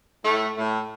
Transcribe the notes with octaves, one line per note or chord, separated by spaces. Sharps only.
A2 A3
A2 A3